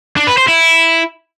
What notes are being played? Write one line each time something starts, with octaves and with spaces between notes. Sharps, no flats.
D4
B4
C5
E4